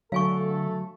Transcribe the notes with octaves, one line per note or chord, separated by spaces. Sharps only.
D3 F#3 A3 A4 F5 G#5 C#6